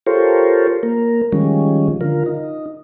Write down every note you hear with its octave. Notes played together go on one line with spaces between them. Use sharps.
F4 G4 A4 A#4 C5 C#5
A#3 A#4
D#3 F3 G3 G#3 C#4
D3 F4 A#4
D#4